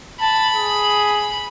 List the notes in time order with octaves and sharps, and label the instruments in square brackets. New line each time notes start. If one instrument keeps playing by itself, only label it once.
[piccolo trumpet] A5 [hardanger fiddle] B5
[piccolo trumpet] G#4